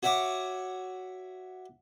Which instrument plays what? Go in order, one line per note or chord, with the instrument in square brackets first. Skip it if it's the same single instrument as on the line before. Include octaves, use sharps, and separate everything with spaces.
[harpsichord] F#4 C#5 E5 F#5 D6